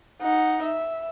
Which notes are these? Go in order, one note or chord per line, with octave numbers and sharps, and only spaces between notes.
D#4 F#5
E5